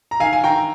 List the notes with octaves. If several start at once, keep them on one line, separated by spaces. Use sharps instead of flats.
A#5
D#3 F5 G#5
G#5
D#3 G5 A#5